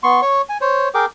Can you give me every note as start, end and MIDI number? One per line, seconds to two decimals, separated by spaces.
0.03 0.21 59
0.03 0.21 84
0.03 0.21 85
0.22 0.42 73
0.22 0.42 85
0.49 0.57 80
0.61 0.89 72
0.61 0.89 73
0.94 1.06 68
0.94 1.06 70
0.94 1.06 79
0.94 1.06 86